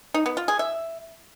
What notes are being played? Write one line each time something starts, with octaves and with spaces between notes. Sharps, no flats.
D#4
B3
F4
G#4
E5